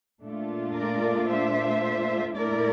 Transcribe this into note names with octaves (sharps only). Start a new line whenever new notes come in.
A#2 A3 D4 F4
A#4 D5
C5 E5
A#2 A3 E4 A#4 D5